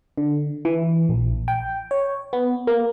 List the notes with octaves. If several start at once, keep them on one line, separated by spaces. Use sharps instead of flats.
D3
E3
A#1
G5
C#5
B3
A#3